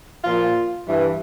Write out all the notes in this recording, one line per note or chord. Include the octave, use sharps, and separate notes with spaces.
A#2 F3 F4
G2 E3